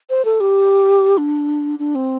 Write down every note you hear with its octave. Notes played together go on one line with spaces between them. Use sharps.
C5
A4
G4
D4
D4
C4